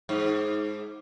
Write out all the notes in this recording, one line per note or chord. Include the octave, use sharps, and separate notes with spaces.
G#2